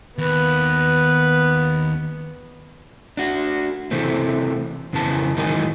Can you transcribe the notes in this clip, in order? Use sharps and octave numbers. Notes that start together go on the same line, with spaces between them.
D#2 B3 B4
D4 F#4
C3 E3 A3 C4
F2 C#3 E3 B3 A5
G#2 D#3 E3 F#3 G#3 D#4